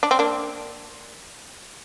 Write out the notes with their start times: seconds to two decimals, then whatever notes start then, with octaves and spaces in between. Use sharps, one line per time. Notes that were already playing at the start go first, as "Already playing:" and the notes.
0.03 D4
0.11 C4
0.19 A#3 D4